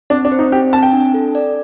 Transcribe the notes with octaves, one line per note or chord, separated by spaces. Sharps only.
C4 D4
D4
C5
D#4
C4 G4
C4 A5
G5
D4
A4
D5